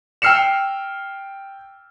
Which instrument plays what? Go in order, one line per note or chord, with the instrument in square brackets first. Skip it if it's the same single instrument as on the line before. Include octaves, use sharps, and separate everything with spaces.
[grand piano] G5 E6 F6 C7 C#7 E7